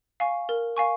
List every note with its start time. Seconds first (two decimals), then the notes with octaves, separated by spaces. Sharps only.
0.20 F5 G#5 C#6
0.49 A#4
0.77 F5 G#5 C#6